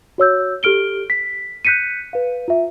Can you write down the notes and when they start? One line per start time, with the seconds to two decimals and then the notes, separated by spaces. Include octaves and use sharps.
0.18 F#4 C#5 E6 G6
0.63 G4 A4 F6 D7 G7
1.10 B6
1.65 F#6 G6 B6 C#7 D#7
2.13 B4 F5
2.48 F4 E5